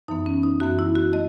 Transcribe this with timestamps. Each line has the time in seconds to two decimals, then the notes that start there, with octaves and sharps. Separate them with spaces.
0.08 F#2 E3 B3 D#4
0.26 C#4
0.43 D#4
0.60 F#2 E3 B3 F#4
0.79 E4
0.96 F#4
1.13 A3 D#5